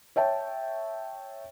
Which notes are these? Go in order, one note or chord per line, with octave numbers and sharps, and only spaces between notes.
C#5 E5 G5 A5